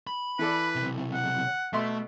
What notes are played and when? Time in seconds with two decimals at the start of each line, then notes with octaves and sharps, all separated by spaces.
0.07 B5
0.39 E3 A4 B4 D5
0.75 B1 C3
1.14 F#5
1.73 B2 A3 E5 C6